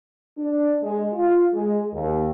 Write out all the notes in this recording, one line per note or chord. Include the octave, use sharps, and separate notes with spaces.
D4
G#3
F4
G#3
D#2